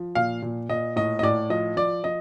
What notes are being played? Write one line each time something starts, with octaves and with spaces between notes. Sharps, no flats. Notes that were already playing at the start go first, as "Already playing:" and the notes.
Already playing: F3
A#2 F5
A#2
A#2 D#5
A2 D#5
D#5
A2 D5
F3 D#5
F3 D5
F3 D#5